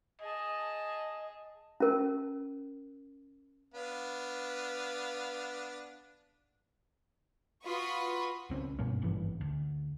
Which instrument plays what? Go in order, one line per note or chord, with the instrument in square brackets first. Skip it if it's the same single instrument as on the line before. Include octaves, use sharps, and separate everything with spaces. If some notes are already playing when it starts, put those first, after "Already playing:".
[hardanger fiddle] G#4 A5 [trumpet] D#5
[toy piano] C#4 A#4
[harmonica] B3 D4 F5
[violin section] F4 F#4 B4 B5 C#6 D#6
[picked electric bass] C#2 C4 C#4
G2 B2 A#3 C#4
G#1 G2 E3
D2